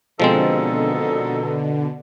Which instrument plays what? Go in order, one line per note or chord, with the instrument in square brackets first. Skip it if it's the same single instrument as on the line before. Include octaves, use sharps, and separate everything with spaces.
[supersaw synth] B2 D3 [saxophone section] D#3 D#4 A4 [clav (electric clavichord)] F3 G#3 C4